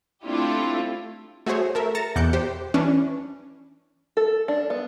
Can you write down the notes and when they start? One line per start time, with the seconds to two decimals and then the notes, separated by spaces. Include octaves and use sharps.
0.24 A3 C4 D4 E4 F4 G4
1.46 A3 F#4 G#4 C5 C#5
1.75 A4 A#4 E5
1.95 A#5 A6 A#6 C#7 E7
2.16 E2 B2 D6 F#6 G6 C#7
2.33 G4 C5
2.74 E3 C#4 D4
4.17 A4
4.48 D4
4.70 B3